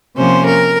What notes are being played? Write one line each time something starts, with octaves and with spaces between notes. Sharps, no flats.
C3 F3 A#3 C#4 C5
A#4